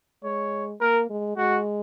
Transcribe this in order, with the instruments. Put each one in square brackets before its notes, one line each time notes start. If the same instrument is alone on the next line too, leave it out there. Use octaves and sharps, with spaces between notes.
[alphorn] G#3 [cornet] C#5
[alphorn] A#3 [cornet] A#4
[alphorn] G#3
[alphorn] G#3 [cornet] F#4